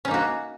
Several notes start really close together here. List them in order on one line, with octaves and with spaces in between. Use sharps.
C#4 D#4 A#3 F#4